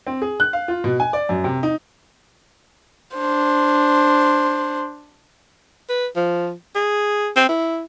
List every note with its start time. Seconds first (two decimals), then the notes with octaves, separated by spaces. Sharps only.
0.07 C4
0.22 G#4
0.40 F#6
0.53 F5
0.68 F4
0.84 B2
1.00 G#5
1.13 D5
1.29 F#2
1.44 C3
1.63 D#4
3.16 D4 C5
5.89 B4
6.16 F3
6.75 G#4
7.36 C4
7.49 E4